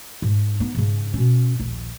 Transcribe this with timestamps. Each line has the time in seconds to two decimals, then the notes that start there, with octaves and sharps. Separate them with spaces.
0.22 G#2
0.60 B3 D#4
0.75 G#2 C#3
1.13 B2 C#4
1.60 A#1 D#2